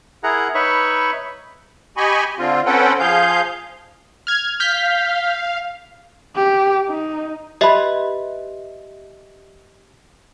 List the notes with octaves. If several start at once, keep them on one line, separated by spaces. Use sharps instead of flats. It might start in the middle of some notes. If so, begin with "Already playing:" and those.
E4 G#4 A#4 F#5 A#5
D#4 B4 C#5 E5 B5 C#6
G4 D#5 G#5 B5 C#6
D3 C4 F4
C4 C#4 A4 B4 F#5 G5
F3 G#4 F5 G6
F6 G#6
F5 F6 G6 B6
G4
D#4
G4 B4 D#5 E5 B5